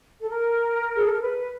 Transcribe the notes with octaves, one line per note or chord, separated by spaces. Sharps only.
A4
A#4
G#4
A4
A#4
B4